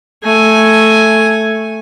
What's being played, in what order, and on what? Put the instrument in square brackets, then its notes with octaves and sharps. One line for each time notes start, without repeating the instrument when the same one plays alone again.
[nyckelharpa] A3 G#5